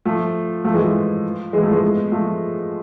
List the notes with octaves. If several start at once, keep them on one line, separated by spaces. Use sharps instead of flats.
F3 A3
F3 A3
E3 G#3
F3
E3 G#3
F3 A3
G#3 B3
F3 A3